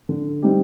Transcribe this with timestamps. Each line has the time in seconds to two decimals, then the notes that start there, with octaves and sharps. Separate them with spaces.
0.09 D3
0.42 G3 C4 D#4 G4